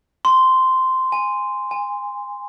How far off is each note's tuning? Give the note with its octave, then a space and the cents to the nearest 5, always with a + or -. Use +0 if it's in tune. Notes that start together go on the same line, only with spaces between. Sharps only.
C6 -10
G#5 -10
G#5 -25